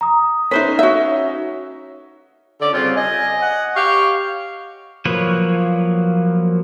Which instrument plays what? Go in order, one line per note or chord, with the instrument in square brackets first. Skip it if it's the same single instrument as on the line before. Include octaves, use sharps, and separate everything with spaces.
[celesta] A#5 D#6
[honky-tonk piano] C#4 D#4 [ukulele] B4 C5 E5 [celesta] B6
[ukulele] F#4 E5
[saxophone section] D3 C#4 D5
[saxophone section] C#3 G3 C4 [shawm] F4
[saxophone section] D#5 [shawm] G#5
[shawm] F#5
[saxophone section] G4 C#5 F5 [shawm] C#6
[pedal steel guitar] F3 F#3 A#3 B4 C#5